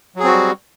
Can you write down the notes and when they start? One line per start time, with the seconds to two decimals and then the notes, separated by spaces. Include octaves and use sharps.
0.16 F#3
0.20 G#4
0.24 C4
0.28 F#4
0.32 G3